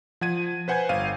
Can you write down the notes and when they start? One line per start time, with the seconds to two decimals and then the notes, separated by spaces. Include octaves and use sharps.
0.21 F3 F#5 G#6 D#7
0.68 B4 C5 F#5 G#5 G6 G#6
0.89 G1 F5 D#7